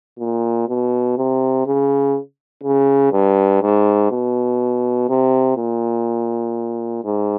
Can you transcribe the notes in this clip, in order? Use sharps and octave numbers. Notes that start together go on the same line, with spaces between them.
A#2
B2
C3
C#3
C#3
G2
G#2
B2
C3
A#2
G#2